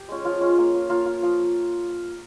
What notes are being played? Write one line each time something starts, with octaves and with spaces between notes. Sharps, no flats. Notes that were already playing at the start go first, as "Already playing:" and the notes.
Already playing: G4
G#3 C#4 F4
F3 F4
G#3 C#4 F4
A#3
F4
A#3 F4
F4
F3